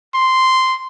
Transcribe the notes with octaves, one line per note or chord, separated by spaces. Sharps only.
C6